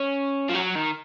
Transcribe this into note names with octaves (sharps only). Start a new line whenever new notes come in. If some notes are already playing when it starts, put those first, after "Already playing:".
Already playing: C#4
F3
F#3
D#3